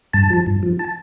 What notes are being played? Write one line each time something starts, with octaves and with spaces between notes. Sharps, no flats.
G2 A5
F3
G2
F3
A5